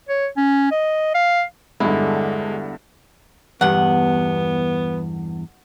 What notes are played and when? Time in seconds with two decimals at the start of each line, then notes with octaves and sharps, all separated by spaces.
0.09 C#5
0.37 C#4
0.71 D#5
1.14 F5
1.80 E2 G2 D3 G3 G#3 E4
3.61 E2 G2 B3 F#5